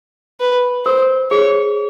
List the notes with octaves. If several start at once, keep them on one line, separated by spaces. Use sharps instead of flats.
B4
A#4 C5
G#4 C#5